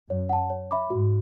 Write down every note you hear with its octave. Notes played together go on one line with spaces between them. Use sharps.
F#2 C#5
F#5 A5
C#5
E5 B5 D6
G#2 F#4